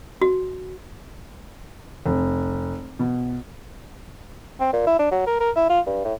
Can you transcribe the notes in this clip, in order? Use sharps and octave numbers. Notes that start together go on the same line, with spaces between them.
F#4
F1
B2
C4
A#2
E4
D4
F#3
A#4
A#4
E4
F4
G2
A2